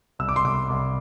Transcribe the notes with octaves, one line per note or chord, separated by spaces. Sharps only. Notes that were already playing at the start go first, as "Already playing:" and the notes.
C2 E6
D6
C6
C2 D6
C2